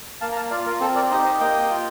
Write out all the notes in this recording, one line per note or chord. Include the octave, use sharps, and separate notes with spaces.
A#3 F5 A5
A#5
F5 A5
F4 D5 F5
A#4
C4 A4 C5
A#4 D5
D#4 G4 C5 D#5
C5 D#5
A#3 D#5 G5
F4